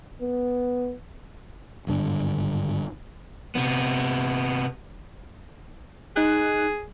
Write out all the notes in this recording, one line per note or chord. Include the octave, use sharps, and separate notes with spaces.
B3
G#1 G2 D3
C3 B3
D#4 G#4 F#6